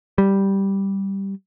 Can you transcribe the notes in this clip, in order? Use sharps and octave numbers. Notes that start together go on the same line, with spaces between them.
G3